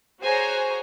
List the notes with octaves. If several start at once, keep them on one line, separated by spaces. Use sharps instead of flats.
F#4 G#4 C5 C#5 G#5 A#5